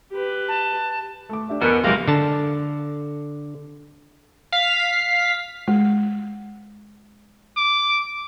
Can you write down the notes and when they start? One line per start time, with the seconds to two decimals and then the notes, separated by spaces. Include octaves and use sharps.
0.11 G4 B4
0.48 A5
1.29 A3 D6
1.49 D4 G4 E5
1.62 E2 B2 A#4 G#5 C#7
1.84 F#1 E2 C3 F3 G3 G#3 A#3
2.08 D3 A5
4.52 F5 B6
5.68 G#3
7.57 D6